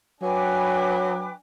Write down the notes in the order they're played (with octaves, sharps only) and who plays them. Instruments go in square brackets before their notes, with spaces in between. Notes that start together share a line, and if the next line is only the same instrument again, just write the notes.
[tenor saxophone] F#3 [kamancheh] D4 G#5 [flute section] B4 G5 D6